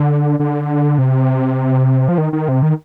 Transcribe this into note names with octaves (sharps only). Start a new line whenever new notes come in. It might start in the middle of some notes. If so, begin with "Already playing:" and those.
Already playing: D3
D3
C3
F3
D#3
D#3
C3
D#3